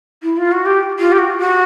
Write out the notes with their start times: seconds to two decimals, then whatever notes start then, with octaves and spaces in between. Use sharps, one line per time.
0.23 E4
0.37 F4
0.51 F#4
0.65 G4
0.99 F4
1.12 G4
1.18 F#4
1.38 F#4